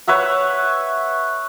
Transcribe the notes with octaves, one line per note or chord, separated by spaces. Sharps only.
B4 C#5 E5 F#5